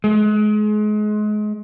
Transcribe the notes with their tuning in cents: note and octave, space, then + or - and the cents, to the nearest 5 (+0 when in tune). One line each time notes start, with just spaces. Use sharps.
G#3 +30